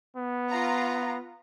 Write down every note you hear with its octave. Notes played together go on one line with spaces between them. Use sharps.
B3
F4 A#5